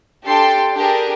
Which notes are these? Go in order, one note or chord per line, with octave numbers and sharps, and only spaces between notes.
D4 G4 A4 G5 A5 C6
D4 G4 G#4 A#4